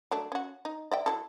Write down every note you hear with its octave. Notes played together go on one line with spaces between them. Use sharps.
F#3 A3 D4
C#4 F#4
D#4
D5 E5 G5
F#3 E4 A4